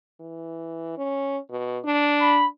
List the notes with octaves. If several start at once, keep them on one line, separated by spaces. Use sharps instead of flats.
E3
C#4
B2
D4
B5